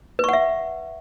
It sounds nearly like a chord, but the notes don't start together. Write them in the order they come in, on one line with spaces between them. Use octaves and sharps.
B4 C#6 F#5 E5